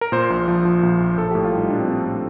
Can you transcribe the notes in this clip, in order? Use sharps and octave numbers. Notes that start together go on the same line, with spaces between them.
A#4
A#2 C5
A#1
F3
F3
A#1
A#1
A#1 A4
A2 G4
F4
G3 D#4
A#1 D4
C4
A#3 D4
A2